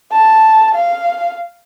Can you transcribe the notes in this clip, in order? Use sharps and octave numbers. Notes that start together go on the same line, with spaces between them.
A5
F5